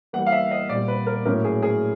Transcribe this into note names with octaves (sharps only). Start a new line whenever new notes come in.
E3 G3 A#3 F#5
F5
E5
D#5
A#2 G3 C4 D5
B4
A#4
A2 F#3 A#3 C#4 A#4
G#4
G#4